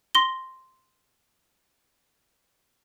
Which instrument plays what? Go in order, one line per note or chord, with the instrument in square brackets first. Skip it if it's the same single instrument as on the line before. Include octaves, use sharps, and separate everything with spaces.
[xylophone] C6 A#6 G7